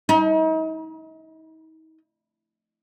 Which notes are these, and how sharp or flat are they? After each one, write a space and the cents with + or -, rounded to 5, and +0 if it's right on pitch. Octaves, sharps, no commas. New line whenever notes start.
D#4 +40